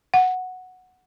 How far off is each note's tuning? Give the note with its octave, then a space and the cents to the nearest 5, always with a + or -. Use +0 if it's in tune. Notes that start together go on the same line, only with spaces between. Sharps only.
F#5 -5